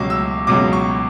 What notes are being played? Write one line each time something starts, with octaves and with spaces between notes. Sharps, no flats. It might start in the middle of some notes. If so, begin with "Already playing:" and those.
Already playing: C#2 B2 F#3 C#6 D6
E6
C#2 B2 F#3 D6
C#6